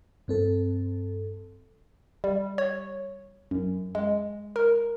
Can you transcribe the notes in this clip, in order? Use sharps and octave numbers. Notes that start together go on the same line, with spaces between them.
G2 C4 A4
G3
C#5
F#2
G#3
A#4